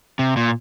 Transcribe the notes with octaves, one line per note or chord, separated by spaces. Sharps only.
C3
A#2